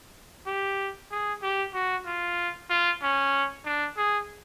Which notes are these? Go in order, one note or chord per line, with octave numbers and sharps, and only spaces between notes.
G4
G#4
G4
F#4
F4
F4
C#4
D4
G#4